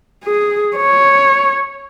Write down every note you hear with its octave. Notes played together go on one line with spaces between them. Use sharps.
G#4
C#5